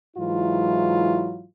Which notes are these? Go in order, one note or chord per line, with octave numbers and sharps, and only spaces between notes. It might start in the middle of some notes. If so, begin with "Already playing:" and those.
G#2 E3 F#3 E4 F4